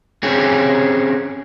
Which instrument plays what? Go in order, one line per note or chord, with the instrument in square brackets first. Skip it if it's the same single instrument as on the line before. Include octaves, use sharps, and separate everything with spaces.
[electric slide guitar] C4 C#4 G4 G#4